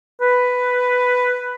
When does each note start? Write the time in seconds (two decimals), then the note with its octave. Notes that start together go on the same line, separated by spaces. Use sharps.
0.21 B4